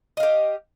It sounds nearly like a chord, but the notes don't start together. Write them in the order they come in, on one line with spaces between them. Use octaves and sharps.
D#5 F5 G4